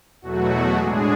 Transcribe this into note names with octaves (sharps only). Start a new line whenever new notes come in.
E2 B2 F#3 A3 F#4
A2 G#3 D4 G#4